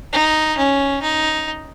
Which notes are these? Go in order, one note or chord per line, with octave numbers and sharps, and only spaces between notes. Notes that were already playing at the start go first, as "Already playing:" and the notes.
D#4
C#4
D#4